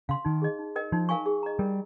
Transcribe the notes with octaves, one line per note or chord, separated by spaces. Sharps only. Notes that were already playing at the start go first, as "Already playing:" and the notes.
C#3 F5 C6
D#3 D#4
G#4 D#5
D#4
A#4 D#5 G5
F3 D#4
A#4 F5 G#5 C#6
G#4
D#5 A#5
G3 A#4